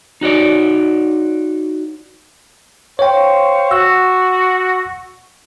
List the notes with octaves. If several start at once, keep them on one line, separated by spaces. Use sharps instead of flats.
D#4 F#4 C#5 D5
C5 C#5 F5 G5 C#6
F#4 E6